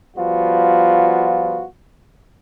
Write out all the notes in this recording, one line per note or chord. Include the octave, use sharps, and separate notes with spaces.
F3 G3 B3 F4 F#4